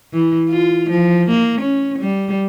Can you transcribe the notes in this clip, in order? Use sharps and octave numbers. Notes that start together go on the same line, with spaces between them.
E3
F4
F3
A#3
C#4
G3